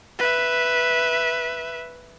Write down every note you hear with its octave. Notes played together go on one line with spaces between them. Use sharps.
B4 E5